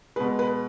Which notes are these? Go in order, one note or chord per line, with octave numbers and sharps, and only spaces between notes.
B2 G#3 B4
B4